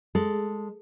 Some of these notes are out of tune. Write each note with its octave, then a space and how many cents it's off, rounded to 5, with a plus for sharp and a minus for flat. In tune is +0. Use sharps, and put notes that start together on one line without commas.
G#3 +0 A4 +0